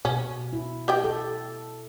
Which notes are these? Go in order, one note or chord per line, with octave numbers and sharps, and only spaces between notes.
B2 C#4
E4
G4 D#5 G5
A4